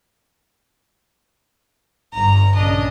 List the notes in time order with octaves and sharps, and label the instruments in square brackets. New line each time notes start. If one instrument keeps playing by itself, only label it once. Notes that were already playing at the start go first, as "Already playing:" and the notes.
[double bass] G1 G2 [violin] A#5
[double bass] A#1 C#3 [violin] D4 D#5